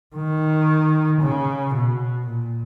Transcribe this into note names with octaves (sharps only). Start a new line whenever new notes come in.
D#3
C#3
B2
A#2